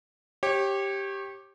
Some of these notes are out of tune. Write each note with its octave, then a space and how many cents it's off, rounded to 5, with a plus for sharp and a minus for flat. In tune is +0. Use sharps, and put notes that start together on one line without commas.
G4 +0 C#5 -30